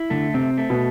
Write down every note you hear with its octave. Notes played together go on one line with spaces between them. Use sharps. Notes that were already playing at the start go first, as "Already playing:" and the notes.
Already playing: E4
D3 A3
C3 C4
A3
B2